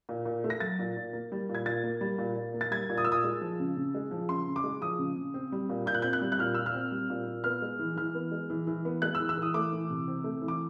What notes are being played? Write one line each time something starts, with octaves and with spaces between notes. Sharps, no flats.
A#2
A#2
A3
A#6
F#3 A6
A#2
A#2
A#3
G3
A#2
G#6
A#2 A6
A#3
G3
A#2
A#2
A#3
A6
G3 G#6
A#2
D#6
A#2 E6
D#6
G#3
F3
C#3
C#3
G#3
F3
C#3 C6
C#3
D6
G#3
F3 D#6
C#3
C#3
C4
G3
A#2
A#2 G6
F#6
C4 G6
F#6
G3
F#6
A#2 F6
A#2 E6
F6
C4
G3
A#2
A#2
B3 F6
G#3
E3
E3 F6
B3
G#3
E3
E3
B3
G#3 F#6
E6
E3
E6
E3 D#6
A3 D6
E3
C3
C4
A3
E3
D6